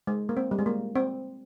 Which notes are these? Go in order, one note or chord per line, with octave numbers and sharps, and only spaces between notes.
G#3
A#3
C4
G3
G#3
A#3
C4